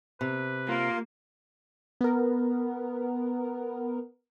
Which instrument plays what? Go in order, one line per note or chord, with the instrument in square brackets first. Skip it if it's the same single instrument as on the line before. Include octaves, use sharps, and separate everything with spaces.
[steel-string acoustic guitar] C3 [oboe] B4
[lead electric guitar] A#3 [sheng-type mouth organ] F4
[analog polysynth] B3 A#4